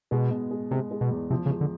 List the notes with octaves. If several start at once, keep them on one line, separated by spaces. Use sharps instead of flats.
B2 G#3
B2
G#3
C3 G#3
G#3
B2
E2
C3 F3
C#3
G#3
D3